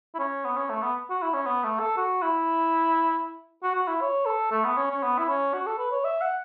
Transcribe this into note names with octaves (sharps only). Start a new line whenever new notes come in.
E4
C#4
B3
C#4
A3
B3
F#4
E4
C#4
B3
A3
A4
F#4
E4
F#4
F#4
E4
C#5
A4
A3
B3
C#4
C#4
B3
E4
C#4
F#4
A4
B4
C#5
E5
F#5